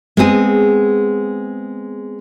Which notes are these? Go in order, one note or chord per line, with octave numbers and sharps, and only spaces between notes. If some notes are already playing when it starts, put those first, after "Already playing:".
G#3 B3 C4 G#4